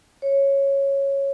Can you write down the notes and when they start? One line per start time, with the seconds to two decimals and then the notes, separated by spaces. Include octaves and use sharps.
0.22 C#5